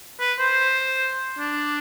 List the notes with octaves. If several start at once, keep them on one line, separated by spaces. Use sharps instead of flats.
B4
C5
D4